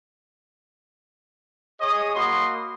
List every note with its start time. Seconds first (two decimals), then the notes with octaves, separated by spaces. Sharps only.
1.81 G#4 C#5 D#5 D#6
2.14 A#3 F#4 B5 C6 D#6